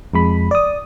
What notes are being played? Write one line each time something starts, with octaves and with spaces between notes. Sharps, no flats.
F2 G#3 B5
D5 D#6